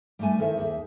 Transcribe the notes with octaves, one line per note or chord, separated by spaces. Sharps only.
G3 A3 G#5
D#3 E4 A4 C5 E5
D#2 G#4 E5